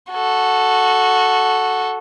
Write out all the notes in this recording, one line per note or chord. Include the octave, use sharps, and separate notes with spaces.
F#4 A4